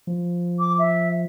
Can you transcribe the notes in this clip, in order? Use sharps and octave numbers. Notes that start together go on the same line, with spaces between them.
F3
D6
E5